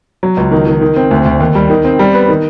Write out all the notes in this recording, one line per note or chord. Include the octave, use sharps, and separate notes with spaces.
F#3
C#2
D#3
D#3
D#3
C4
D2
D2
D#2
G3
D#3
C4
G3
B3
D#3